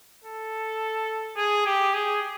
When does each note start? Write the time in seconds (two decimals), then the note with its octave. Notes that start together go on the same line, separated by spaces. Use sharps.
0.24 A4
1.37 G#4
1.66 G4
1.94 G#4